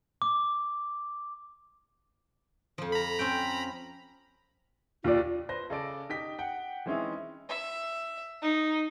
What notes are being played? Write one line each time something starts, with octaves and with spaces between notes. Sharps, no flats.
D6
F2 F3
A#5 B5
C4 C#4 G5
D#2 F4 D5
B4 C5 A#6
C#3 A4 D5 D7
D#4 G4 G5 B6
F#5 G5
E3 G#3 C4 C#4 D#4 E4
E5
D#4